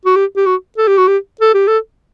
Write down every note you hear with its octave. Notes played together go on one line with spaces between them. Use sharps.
F#4
G4
G4
F#4
A4
G4
F#4
G4
A4
G4
A4